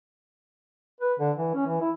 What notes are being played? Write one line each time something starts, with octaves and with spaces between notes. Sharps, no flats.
B4
D3
E3
C#4
E3
E4